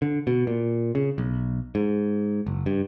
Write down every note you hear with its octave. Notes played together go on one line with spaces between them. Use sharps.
D3
B2
A#2
C#3
B1
G#2
F#1
G2